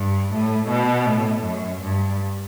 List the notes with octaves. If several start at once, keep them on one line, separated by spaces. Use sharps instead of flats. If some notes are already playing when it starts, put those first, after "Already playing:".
Already playing: G2
A2
B2
A2
F#2
G2